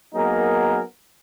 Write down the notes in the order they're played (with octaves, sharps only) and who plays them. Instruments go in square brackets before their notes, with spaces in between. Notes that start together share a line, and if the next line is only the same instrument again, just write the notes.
[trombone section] F#3 A#3 B3 D#4 G#4 A#4